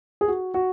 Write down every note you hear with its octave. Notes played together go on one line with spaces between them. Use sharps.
G#4
F#4
F#4